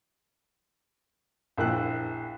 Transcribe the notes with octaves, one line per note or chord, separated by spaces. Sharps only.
A#1 E4 G5 F#6